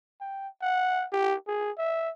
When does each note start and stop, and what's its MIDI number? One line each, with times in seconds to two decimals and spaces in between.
0.21 0.48 79
0.62 1.06 78
1.13 1.35 67
1.48 1.71 68
1.78 2.11 76